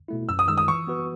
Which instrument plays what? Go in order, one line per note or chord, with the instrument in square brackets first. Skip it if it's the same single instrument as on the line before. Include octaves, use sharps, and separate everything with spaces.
[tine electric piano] B2 A3 E4
[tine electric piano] F#2 [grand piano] E6
[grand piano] D#6
[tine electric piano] D#3 G#3 [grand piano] E6
[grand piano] D#6
[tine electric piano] E3 [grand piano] C#6
[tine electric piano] B3 F#4 B4